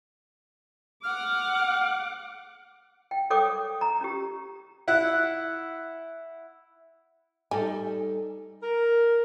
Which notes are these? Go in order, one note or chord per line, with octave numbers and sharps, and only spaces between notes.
F#5 D6 F6
G5
A4 C#5 G5 D6 D#6
A#5
C#4 G4
E4 F#5
G3 D#4 A4 G#5
A#4